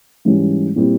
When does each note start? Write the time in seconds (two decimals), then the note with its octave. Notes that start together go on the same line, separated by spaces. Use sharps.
0.25 G#2 E3 G3 C#4
0.76 A#2 G3 C4 E4 G4